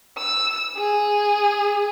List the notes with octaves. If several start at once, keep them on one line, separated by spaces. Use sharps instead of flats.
E6
G#4